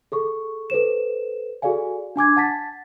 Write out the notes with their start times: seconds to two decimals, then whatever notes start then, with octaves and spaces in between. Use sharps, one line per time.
0.12 G#4 A4 C#6
0.70 A4 B4 C5 E7
1.62 F#4 G#4 A4 D5 F5 G#5
2.16 D4 G#5 D6 G#6
2.36 F#5 A5 A6 B6